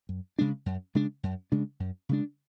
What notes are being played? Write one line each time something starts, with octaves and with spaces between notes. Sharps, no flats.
F#2
C#3 G#3 D4
F#2
C#3 G#3 D4
F#2
C#3 G#3 D4
F#2
C#3 G#3 D4